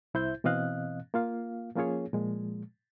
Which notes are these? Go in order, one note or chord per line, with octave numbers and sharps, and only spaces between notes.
C2 E4 C5 E5 G6
B2 E3 C4 D#5 F5 F#6
A#3 F4 F5
F3 A#3 C#4 F4 G#4 C#5
A#2 F3 G#3